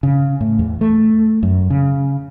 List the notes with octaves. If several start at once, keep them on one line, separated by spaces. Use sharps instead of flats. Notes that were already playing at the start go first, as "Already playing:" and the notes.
C#3
A2
E2
A3
F#2
C#3